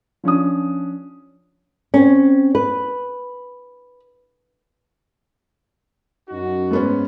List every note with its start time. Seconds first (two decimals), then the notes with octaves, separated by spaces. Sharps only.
0.24 F3 C#4 D4 D#6
1.94 C4 C#4
2.55 B4
6.29 F#2 D#4 F#4
6.71 G#2 B3 C#4